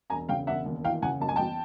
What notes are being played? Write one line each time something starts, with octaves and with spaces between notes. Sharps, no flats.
E1 G#5 A#5
C#3 F5 G5
E1 E5 F#5
D#2
E3 F5 G5
C#3 F#5 G#5
F#1 A5
G#5
E2 G5 A5